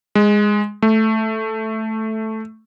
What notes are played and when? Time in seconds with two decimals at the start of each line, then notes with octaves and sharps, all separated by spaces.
0.15 G#3
0.82 A3